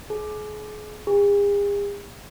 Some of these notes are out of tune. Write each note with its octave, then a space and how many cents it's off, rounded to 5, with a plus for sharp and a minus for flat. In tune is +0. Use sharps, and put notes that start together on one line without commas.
G#4 +35
G#4 -45